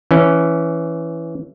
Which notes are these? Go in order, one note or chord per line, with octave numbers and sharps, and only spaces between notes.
E3 C#4